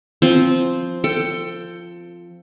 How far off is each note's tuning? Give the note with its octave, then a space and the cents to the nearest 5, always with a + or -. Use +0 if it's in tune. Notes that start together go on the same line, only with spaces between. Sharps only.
F3 -10 C4 +0
A4 +20 G5 +0